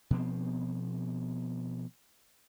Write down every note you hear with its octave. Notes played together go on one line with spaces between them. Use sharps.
B2 F3 B3 C4